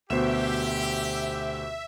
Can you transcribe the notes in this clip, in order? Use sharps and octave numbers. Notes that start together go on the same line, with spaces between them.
D2 B2 G4 C5 E5 E7